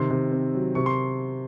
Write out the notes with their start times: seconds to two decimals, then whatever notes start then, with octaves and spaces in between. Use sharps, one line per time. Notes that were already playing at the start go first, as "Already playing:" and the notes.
Already playing: C3 D#3 C6
0.11 C3
0.32 C4
0.55 F#3
0.75 C3 C#6
0.86 C6